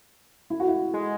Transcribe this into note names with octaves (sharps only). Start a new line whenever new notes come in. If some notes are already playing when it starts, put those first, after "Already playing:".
E4
F#4
E4
G#3